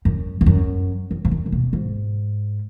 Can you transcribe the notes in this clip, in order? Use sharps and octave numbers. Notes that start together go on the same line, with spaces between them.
F#2
E2
F#2
F#2
G#2
F#2
C#3
B2
G#2